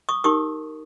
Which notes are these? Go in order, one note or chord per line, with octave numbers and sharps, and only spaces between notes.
C#6 D#6
D#4 G4 A#4 C#6 D#6